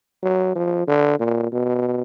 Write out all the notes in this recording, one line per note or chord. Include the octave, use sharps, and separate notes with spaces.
F#3
F3
D3
A#2
B2